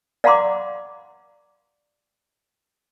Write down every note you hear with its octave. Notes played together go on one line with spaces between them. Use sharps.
D5 F5 F#5 A#5 C6 D6